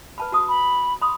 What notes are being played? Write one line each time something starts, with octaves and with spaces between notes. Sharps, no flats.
B4 A5 B5
F#4 A5 D#6
B5
B5 C6 D#6